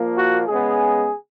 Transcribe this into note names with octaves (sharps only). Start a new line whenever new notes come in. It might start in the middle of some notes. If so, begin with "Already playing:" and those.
Already playing: A#2 F3 A#3
F#4
C#3 G#3 B3 G#4